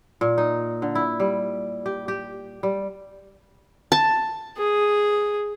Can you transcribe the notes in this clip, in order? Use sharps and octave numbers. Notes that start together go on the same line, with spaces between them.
A#2
D#4
D3
E4
G3
G4
G4
G3
A5
G#4